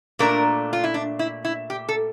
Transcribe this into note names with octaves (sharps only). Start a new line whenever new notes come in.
A#2 A3 D4 A#4
F4
E4
D4
E4
E4
G4
A4